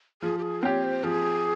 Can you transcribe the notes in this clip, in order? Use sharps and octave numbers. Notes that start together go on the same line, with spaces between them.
F3 G#4
G4
G#4
C4 G4 C#5
C5
F3 G#4